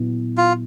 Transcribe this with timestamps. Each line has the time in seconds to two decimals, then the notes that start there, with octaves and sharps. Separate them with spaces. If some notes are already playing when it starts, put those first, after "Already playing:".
Already playing: A#2 F#3 B3 E4
0.37 F4